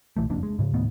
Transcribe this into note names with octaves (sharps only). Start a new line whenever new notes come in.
B1 F2 E3 A3
F#1 F2 A#3 D4
G#3
G#2 C#3
D#2 A2 D#3 B3